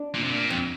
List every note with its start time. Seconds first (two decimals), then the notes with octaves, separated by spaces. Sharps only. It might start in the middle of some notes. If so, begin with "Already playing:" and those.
Already playing: D4
0.15 A#2
0.23 C3
0.31 A#2
0.50 F2 C4